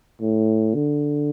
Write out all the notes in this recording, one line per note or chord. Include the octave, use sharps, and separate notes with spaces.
A2
D3